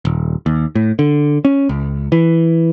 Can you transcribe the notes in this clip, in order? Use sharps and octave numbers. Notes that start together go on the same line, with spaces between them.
D#1
D#2
A2
D3
C#4
C#2
E3